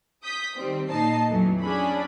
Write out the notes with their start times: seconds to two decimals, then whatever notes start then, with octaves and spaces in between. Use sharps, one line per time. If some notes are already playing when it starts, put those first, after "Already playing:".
0.22 D#6 G6 B6
0.54 D#3 G3 C4
0.89 A#2 D#4 D#5 A5 C7
1.28 F2 E3 F#3 A3
1.61 C#4 D4 G#4 B5